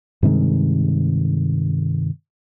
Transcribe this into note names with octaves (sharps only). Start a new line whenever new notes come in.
G2 C3 D#3 G#3